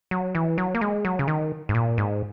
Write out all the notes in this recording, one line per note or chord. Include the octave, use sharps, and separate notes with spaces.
F#3
E3
F#3
A#3
G#3
F#3
C#3
D#3
G#2
A#2
G#2